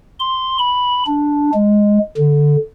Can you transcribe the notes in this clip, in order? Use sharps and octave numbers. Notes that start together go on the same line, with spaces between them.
C6
B5
D4
G#3
D3